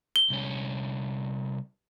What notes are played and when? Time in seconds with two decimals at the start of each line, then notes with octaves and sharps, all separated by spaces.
0.16 G7
0.30 C2 C#4